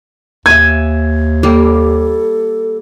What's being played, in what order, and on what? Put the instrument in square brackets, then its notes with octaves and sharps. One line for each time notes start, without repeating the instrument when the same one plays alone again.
[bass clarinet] D#2 [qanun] E5 G#5 [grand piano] G#6
[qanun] G3 A#3 [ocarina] A4